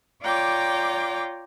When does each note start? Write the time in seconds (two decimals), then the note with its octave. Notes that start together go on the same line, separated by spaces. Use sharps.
0.23 F4 C#5 D5 G5 A#5 D6